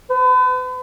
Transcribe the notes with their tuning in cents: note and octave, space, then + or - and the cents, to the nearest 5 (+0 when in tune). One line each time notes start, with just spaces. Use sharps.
B4 +40